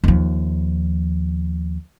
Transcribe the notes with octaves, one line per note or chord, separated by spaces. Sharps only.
D#2 F3